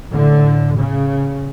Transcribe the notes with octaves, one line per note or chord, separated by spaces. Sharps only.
A2 D3
C#3